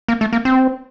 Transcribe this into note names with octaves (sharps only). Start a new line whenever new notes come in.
A#3
A3
A#3
C4